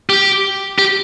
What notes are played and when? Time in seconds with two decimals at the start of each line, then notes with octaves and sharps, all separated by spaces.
0.10 G4
0.79 G4